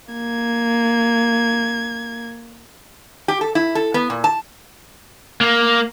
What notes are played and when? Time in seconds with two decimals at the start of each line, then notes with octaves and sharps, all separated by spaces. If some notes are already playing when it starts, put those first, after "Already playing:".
0.13 A#3 G#6
3.28 G4
3.41 A4
3.55 E4
3.75 A4
3.94 B3
4.10 A#2
4.24 A5
5.41 A#3